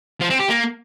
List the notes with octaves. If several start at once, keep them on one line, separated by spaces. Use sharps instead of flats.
F3
C4
G4
A#3